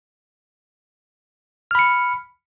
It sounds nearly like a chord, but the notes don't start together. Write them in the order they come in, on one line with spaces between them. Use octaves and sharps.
F6 B5 C#7